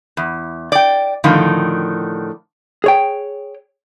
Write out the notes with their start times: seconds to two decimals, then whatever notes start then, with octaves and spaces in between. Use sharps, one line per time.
0.17 E2
0.72 D5 G5
1.24 A2 D3 D#3 F3
2.84 G#4 C#5 G5